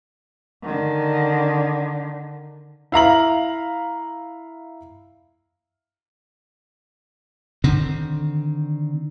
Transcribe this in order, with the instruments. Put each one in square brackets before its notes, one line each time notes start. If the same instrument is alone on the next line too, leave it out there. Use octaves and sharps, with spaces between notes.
[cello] D3 D#3
[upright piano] E4 F5 A#5 F#7
[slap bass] D3 D#3 C4